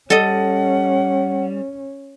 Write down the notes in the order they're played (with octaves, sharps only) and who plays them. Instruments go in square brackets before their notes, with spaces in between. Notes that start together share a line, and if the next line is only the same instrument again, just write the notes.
[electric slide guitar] G3 [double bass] C#4 [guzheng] A4 D#5 [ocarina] F#5